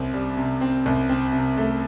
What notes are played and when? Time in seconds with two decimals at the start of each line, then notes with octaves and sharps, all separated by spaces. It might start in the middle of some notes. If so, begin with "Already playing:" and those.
Already playing: C2 C4
0.14 G3
0.37 C3
0.61 C4
0.86 C2
1.09 C4
1.33 C3
1.57 A3